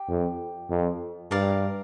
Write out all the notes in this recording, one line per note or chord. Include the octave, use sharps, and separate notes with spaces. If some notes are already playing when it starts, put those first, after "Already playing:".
Already playing: G4
F2
F2
G2 A#4 D5 F5